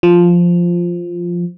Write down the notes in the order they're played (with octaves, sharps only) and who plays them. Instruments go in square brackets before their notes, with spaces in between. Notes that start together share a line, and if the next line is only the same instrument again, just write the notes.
[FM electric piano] F3